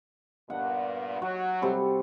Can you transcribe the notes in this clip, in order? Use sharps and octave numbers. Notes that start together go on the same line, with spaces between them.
G2 A#2 B3 F#5
F#3 F#4
C3 G3 A4